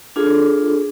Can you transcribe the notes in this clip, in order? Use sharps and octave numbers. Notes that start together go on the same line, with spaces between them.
D4 F4 G#4 A4